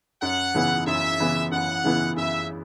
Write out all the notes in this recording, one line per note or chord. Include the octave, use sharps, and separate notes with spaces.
F#2 F#5
C#3 E3 B3 E4
F#2 E5
C#3 E3 B3 E4
F#2 F#5
C#3 E3 B3 E4
F#2 E5